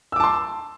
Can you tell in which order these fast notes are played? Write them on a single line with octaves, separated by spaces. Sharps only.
E6 D6 A5 C6